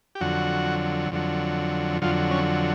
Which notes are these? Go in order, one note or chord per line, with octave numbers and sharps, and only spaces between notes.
G4
F2 D3 F#3 F#4
F2 D3 F#3
F2 D3 F#3 F4
C#4